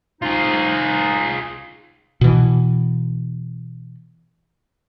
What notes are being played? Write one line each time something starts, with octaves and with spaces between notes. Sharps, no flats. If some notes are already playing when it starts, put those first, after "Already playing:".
F3 D#4 F4 G#4
B2 E3